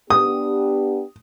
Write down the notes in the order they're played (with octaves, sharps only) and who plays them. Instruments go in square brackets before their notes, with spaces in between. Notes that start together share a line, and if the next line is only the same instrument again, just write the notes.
[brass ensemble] B3 D4 G4 [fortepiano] D#6